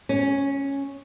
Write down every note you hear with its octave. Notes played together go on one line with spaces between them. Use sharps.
C#4